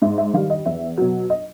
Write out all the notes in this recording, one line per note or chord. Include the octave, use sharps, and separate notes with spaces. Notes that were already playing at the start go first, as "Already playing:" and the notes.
G#2 E5
E5
D#3 G3 F5
D#5
E2 E5
B2 F#3
D#5